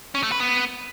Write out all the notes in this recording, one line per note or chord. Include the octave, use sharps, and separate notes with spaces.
C#4
A3
B4
B3